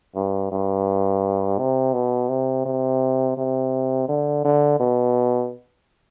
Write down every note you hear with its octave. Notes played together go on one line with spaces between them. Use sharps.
G2
G2
C3
B2
C3
C3
C3
D3
D3
B2